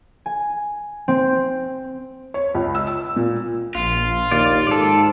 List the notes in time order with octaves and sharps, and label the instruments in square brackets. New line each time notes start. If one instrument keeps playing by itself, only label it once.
[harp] G#5
C4
[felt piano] C#5
C#2
E6
E6
A#2
[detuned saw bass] A#1 [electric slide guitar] F4
[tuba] D#2 [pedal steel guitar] D5 F5
[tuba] G#2 [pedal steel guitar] A4 D5